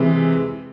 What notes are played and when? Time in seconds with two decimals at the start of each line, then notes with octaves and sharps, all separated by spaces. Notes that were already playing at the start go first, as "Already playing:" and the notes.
Already playing: C3 E3 G#3